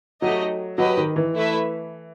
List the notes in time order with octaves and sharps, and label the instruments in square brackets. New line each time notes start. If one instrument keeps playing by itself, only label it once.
[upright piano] F#3 [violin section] A3 D#4 G4 D#5
[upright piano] F#3 [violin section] G4 B4 D#5
[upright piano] D#3
E3
[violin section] A3 E4 B4 E5